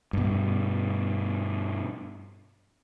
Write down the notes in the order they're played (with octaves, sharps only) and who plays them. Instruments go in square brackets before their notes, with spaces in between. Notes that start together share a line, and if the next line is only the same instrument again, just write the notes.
[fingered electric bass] G2 B2